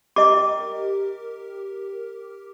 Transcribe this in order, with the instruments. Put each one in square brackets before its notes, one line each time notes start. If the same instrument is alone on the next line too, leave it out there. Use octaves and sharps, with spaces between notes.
[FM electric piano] G4 A#4 [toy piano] D#5 D6